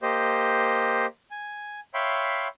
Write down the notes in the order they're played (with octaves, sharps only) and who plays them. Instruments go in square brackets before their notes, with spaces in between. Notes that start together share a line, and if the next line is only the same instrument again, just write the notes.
[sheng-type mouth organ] A#3 G4 C5 D#5
G#5
C#5 E5 F5 G5 B5 C6